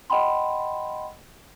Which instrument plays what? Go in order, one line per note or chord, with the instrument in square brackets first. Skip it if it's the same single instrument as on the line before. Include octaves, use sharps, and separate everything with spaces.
[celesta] D#5 F#5 G5 B5 C6